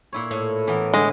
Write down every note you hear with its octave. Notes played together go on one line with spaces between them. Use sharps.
A#2 E4 C#5
A2
E3 B3 A#4
D3 G#3 B4